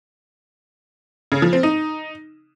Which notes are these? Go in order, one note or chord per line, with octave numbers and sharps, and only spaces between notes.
C#3
F3
C4
D#4